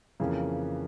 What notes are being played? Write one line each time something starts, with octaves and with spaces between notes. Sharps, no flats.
F2 C#3 E3 A#3